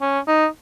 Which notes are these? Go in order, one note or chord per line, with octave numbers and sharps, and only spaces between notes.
C#4
D#4